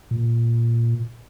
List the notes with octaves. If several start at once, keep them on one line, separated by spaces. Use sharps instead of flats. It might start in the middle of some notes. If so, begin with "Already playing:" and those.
A#2